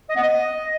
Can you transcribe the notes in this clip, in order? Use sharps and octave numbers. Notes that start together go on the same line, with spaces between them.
D#5
B3
D#5